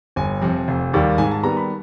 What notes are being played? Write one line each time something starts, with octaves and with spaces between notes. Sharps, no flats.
G1 G#5
F2 C3
F1
D#2 D#3 G3
G#2 G#5
A5
D#3 G3 B3 A#5
B5